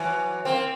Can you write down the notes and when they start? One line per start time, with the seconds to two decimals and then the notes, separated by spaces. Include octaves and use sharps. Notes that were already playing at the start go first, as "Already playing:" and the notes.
Already playing: E3 F#3
0.45 A#3 C4